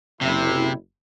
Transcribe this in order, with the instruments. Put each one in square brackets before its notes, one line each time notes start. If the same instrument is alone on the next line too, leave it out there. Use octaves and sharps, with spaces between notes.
[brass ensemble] F#1 E4 [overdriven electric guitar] C3